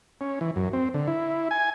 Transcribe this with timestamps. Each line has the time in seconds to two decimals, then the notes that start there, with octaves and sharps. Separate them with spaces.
0.21 C#4
0.41 E3
0.56 F#2
0.73 C4
0.94 D3
1.08 E4
1.51 G#5